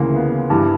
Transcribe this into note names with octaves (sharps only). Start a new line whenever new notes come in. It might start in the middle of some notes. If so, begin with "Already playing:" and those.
Already playing: D2 C#3 E3 A#3
B3
G2 E3